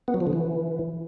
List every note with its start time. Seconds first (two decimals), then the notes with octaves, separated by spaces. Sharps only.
0.08 B3
0.14 F#3
0.20 F3
0.27 D3
0.33 E3